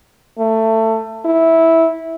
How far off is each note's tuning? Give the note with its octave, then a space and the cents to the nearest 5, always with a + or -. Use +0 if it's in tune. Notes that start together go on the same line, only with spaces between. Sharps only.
A3 +20
E4 -10